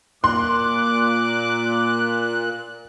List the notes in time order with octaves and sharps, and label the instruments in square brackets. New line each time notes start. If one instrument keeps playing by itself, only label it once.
[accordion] A#2 F#6 [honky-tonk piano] C6 [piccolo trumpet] D6